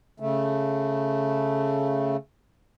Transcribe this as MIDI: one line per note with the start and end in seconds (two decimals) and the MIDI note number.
0.20 2.17 49
0.20 2.17 57